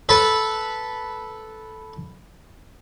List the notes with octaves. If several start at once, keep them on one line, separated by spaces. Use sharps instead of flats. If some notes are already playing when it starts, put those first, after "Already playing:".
A4 B4 B5